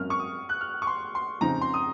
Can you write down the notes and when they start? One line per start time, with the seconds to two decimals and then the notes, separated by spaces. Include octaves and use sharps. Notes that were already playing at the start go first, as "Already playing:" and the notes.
Already playing: G#1 F#2 A#3 C#4 F6
0.10 C#6
0.19 D#6
0.49 F#6
0.61 F6
0.82 C#6
0.87 C6
1.15 C6
1.41 F2 C#3 F3 C4 D#4 A#5
1.61 C6
1.74 D#6